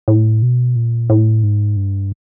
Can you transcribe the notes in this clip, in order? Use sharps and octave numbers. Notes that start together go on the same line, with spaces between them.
A2
B2
A#2
A2
G#2
G2